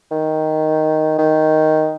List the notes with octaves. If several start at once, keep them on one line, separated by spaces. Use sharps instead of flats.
D#3
D#3